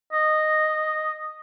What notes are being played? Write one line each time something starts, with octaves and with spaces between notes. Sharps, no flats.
D#5